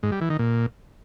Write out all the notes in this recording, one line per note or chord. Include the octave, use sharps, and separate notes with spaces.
G#2
G3
E3
D#3
A#2